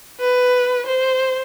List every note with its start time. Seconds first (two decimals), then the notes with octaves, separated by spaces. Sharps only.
0.20 B4
0.86 C5